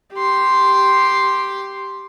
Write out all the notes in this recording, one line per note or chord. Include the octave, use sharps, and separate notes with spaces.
G4 C6